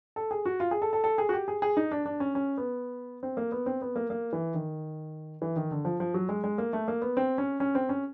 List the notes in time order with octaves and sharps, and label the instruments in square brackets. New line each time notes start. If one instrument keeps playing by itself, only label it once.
[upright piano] A4
G#4
F#4
F4
G#4
A4
A4
A4
G#4
F#4
G4
G#4
G#4
D#4
D4
D4
C#4
C#4
B3
C4
A#3
B3
C4
B3
A#3
A#3
E3
D#3
E3
D#3
D3
F3
F3
F#3
G#3
G#3
A#3
A3
A#3
B3
C4
C#4
C#4
C4
C#4